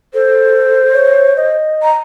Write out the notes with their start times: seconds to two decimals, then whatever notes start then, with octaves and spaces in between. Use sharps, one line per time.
0.14 A4 C5
0.94 C#5
1.37 D#5
1.83 A#5